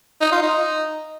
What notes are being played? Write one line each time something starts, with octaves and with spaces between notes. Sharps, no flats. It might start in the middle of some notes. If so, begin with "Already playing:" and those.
D#4
F4
D#4